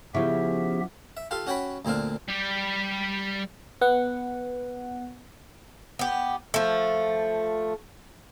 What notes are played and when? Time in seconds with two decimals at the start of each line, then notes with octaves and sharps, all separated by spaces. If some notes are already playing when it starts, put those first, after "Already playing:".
0.14 C#3 F3 B3 E4 G4 E5
1.17 E5
1.31 F4 G4 A4 F5
1.47 C#4 F#4 C#5 G5 B5
1.85 D2 A#2 C4 D4 F5
2.28 G3 G4
3.81 B3 F#5
5.99 B3 G4
6.54 F3 A3